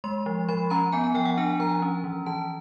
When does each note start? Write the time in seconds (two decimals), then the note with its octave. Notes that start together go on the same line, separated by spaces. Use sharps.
0.04 G#3 C6
0.26 F3
0.49 F3 B5
0.70 C#4 A#5
0.92 B3 G#5
1.04 G#5
1.14 F3 G5
1.26 F#5
1.37 D4 G#5
1.60 F3 A#5
1.82 C#4
2.04 E3
2.26 E3 A5